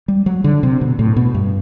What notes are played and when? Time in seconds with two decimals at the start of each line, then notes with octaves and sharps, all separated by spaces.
0.08 G3
0.26 F#3
0.44 D3
0.63 C3
0.81 B2
0.99 A2
1.16 B2
1.35 G2